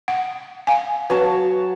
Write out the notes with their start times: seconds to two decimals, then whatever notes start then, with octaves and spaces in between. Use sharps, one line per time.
0.08 F#5
0.67 F5 G#5
1.10 F#3 B4 C#5 A5